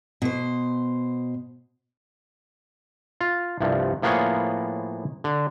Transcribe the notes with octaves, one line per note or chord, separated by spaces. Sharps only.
B2 C5
F4
C2 G2 F3
A2 F3 A#3 B3 G#4 C#5
D3